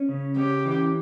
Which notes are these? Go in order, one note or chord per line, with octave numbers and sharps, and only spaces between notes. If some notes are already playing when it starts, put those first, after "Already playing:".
Already playing: C#4
C#3
C#4 G4
E3